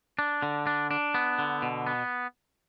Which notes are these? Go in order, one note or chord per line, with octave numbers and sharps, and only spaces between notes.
D4
D3
D4
D4
B3
D3
B2
B3